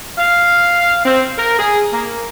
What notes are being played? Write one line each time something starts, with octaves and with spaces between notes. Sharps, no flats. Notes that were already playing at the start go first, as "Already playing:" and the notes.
F5
C4
A#4
G#4
A#3